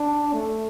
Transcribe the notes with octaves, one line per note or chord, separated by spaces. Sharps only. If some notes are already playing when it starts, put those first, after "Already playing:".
Already playing: D4
A3